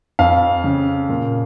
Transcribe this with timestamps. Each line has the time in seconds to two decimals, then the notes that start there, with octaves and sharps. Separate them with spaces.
0.19 F2 F5
0.64 C#3
1.09 A#2